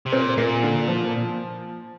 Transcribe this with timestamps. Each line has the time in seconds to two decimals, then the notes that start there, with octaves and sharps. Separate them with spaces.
0.06 C3
0.12 A#2 C4
0.37 A#2 A#3
0.63 D3
0.88 F3